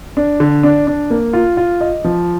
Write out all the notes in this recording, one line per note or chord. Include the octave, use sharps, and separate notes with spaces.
D4
D3
D4
D4
A#3
F4
F4
D#5
F3